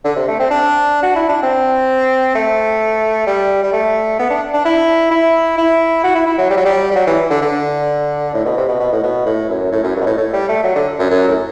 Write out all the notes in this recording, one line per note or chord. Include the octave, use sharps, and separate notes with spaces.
D3
C3
A3
C4
D4
F#4
E4
D4
C4
A3
G3
G3
A3
B3
D4
D4
E4
E4
E4
F#4
E4
E4
F#3
G3
F#3
G3
G3
F#3
E3
D3
D3
A2
B2
C3
B2
B2
A2
B2
A2
F#2
A2
F#2
G2
B2
A2
A2
G3
A3
F#3
D3
F#2
F#2
A2